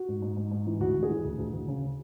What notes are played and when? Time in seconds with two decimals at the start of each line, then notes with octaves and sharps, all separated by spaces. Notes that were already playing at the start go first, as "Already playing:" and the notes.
Already playing: F#4
0.08 G#2
0.22 G#2
0.37 G#2
0.51 G#2
0.67 E3
0.80 D2 F#4
0.95 D2
1.03 G#4
1.10 E3
1.25 D2
1.39 D2
1.54 D2
1.68 C#3